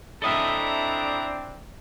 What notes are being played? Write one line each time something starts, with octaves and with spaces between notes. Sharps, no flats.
C4 D4 E4 A4 D#5 E5 A#5